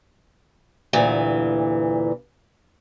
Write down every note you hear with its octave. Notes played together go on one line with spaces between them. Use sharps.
D2 G2 A#2 E3